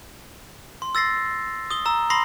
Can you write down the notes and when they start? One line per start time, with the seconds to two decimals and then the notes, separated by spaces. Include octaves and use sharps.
0.82 C6
0.95 E6 A6 A#6 C7
1.71 D#6 G7
1.86 A#5 E6
2.10 B5 C6 D#6 A#6 C7